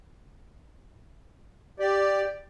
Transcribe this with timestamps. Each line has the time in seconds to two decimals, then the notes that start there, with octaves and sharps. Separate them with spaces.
1.79 G4 D5